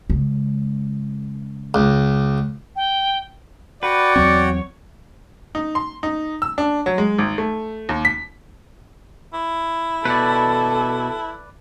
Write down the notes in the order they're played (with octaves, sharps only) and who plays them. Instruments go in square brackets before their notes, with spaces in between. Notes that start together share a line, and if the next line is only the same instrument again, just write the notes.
[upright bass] C#3 G#3
[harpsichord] C#2
[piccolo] G5
[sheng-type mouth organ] F#4 F#5 G5 [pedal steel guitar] B4 [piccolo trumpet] D5
[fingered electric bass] E2 F#3 C4 [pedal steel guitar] C#5
[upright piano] D#4
C6
D#4
E6
D4
F#3
G#3
G#1
A3
D#2
B6
[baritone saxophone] E4
[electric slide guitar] B2 [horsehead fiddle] A4 [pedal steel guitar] B4 D5